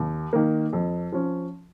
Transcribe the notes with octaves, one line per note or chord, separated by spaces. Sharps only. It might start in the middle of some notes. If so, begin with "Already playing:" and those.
Already playing: D#2
D#3 A#3
F2
F3 C#4